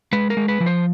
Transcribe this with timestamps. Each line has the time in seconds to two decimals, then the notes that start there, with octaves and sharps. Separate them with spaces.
0.12 G#3 B4
0.30 A#4
0.37 G#3
0.48 B4
0.60 F3
0.66 C5